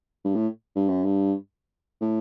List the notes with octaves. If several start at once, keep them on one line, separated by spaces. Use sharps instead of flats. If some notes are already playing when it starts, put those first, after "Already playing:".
G2
A2
G2
F#2
G2
A2